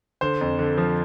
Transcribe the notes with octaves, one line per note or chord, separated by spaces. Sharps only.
D3 C5
F2
D3
F3